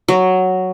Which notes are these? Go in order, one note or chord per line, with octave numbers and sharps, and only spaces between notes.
F#3